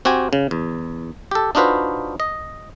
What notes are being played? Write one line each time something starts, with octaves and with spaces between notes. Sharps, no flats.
C4 F#4 G4 G#5
C#3
E2
G4 A4
D4 D#4 F4 F#4 B4 C5
D#5